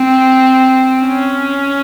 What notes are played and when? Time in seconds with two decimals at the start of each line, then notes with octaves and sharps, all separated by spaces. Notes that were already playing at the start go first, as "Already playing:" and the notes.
Already playing: C4
1.05 C#4